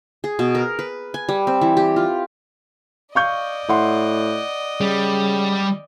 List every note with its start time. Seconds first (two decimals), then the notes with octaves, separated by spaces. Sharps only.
0.24 G#4
0.39 B2
0.55 A#4
0.79 B4
1.14 G#5
1.29 G3
1.47 C4
1.61 E3
1.77 G4
1.96 F4
3.15 D5 D#5 F5 C#6 G6
3.69 A2 E5 F#5 C6
4.81 C#3 G3